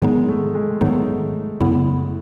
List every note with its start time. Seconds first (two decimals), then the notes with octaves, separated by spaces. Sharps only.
0.02 G#2 D#3 F#3 G#3 B3 D#4
0.28 A3
0.55 G#3
0.81 G#2 D#3 F#3 A3 B3 D#4
1.60 F#2 C#3 F#3 B3 E4